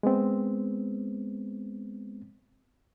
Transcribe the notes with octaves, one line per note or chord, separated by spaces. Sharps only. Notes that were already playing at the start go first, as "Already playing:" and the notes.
G#3 B3 C4